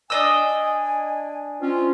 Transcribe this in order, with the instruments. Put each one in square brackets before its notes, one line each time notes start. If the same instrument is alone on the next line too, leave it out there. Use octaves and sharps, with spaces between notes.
[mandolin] D4 D#5 E6 [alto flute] G#5
[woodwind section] C4 C#4 F4